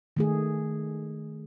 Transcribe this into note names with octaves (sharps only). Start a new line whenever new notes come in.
D#3 A3 G#4